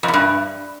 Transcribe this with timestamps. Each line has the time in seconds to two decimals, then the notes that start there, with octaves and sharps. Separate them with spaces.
0.03 F2
0.08 E2
0.14 G2